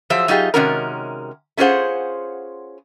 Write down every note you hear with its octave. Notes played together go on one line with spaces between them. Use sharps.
F3 F#3 G#4 C5 E5
F#3 D#4 F4 G4 G#4
C3 D#3 G#3 C#4 F#4 A#4
A3 C#4 F4 G#4 C5 F#5